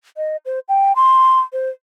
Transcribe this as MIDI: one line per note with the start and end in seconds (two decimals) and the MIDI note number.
0.17 0.37 75
0.45 0.59 72
0.68 0.92 79
0.96 1.39 84
1.53 1.69 72